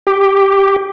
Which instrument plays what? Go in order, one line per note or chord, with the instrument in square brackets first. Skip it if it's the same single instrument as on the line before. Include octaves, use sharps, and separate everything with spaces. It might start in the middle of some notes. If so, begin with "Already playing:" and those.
[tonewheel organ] G4